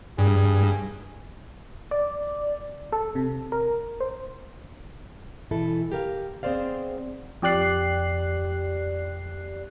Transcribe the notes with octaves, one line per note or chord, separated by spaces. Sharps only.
G2 G#4
D5
A4
C3
A#4
C5
B2 E3 E4 A4
G4 A#4 F5
B3 C4 G#4 C5 D5 F5
F2 G4 D5 F#6 C7